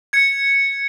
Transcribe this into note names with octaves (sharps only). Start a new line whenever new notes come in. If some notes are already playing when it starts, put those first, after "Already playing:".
G#6 C#7